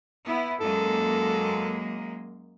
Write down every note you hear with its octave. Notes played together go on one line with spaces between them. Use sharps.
B3 E4
F#2 G#3 A#3 A4